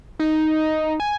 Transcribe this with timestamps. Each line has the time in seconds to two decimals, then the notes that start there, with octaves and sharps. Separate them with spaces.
0.20 D#4
1.00 G#5